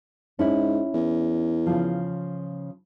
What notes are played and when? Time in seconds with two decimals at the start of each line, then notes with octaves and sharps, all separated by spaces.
0.39 G#2 C#4 E4
0.94 E2
1.66 C#3 F3